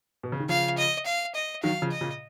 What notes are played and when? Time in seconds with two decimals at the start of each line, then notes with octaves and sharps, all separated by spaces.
0.23 B2
0.32 C#3
0.40 D#3
0.49 C#3 F3 F5
0.78 D#5
1.06 F5
1.35 D#5
1.63 D#3 F#3 F5
1.82 C#3 F3
1.92 D#5
2.01 A#2 C#3